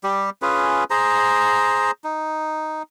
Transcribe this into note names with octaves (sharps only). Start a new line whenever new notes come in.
G3 G4
C#4 F4 G#4 B4
G#4 C5 A#5
D#4